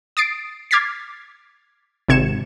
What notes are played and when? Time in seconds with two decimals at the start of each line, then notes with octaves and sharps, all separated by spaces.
0.17 D#6 A6 C7 D7
0.71 D6 F6 G#6 A6 B6 C7
2.08 G#1 C3 G#6 C#7 E7